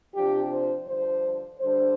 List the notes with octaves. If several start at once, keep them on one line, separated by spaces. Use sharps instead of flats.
C3 F3 D4 G4
C5
G2 D3 F3 D4 C5
D3 G3 D4 C5